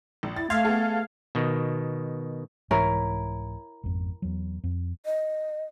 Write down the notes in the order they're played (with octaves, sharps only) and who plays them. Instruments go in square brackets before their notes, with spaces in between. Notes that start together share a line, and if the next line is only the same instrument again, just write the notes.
[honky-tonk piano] A#1
[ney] E4 [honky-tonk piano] A6
[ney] A3 [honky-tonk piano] E5 C6 G#6 [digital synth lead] F5
[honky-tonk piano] B3 G#4 A4
[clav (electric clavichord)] B2 D#3
[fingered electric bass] C2 G#2 E3 [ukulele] E4 A#4 C#5
[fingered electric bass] G#1 F2
E2 F#3
F2
[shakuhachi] D#5